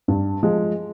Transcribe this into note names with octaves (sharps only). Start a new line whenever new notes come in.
G2
F3 G#3